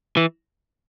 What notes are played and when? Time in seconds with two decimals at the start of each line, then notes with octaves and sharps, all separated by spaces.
0.17 E3